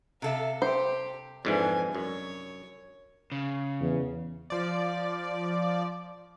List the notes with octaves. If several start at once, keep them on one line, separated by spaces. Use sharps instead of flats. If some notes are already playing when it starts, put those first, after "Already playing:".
C3 A4 E5 F5
G4 C5
F2 G#2 E3 D4 G#5
F#2 C#5
C#3
E2
F3 D5